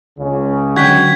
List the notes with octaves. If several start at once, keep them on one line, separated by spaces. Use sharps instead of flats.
C#2 C#3
D3 F#3 C#4 F#4 G5 G#6 B6